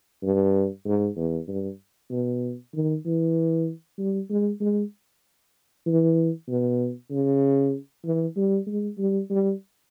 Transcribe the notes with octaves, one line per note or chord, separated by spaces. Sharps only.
G2
G#2
E2
G2
B2
D#3
E3
G3
G#3
G#3
E3
B2
C#3
E3
G3
G#3
G3
G3